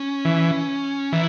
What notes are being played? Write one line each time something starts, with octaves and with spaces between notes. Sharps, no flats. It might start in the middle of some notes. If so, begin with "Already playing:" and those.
Already playing: C#4
E3
E3 E4